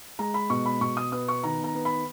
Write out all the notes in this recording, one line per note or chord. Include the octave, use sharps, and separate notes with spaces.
G#3 A#5
B5
B2 C#6
B5
B2 C#6
D#6
B3 D#6
C#6
D#3 A#5
A#5
B3
B5